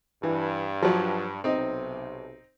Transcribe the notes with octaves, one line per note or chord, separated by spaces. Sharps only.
G2 E3
F3 F#3
B1 C3 C4 D#4